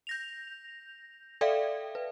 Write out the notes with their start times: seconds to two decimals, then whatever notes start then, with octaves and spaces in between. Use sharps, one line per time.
0.07 G6 A#6 F7
1.41 A4 D5 E5 F5 G5
1.95 B4